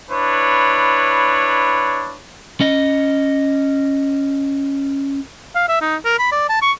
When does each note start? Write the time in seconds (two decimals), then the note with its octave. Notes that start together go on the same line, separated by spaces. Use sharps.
0.10 D4 E4 B4 C#5
2.60 C#4 D#5
5.56 F5
5.68 E5
5.82 D#4
6.05 A#4
6.19 B5
6.32 D5
6.49 A5
6.62 C#6